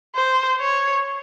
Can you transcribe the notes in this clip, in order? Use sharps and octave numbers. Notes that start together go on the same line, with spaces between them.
C5
C#5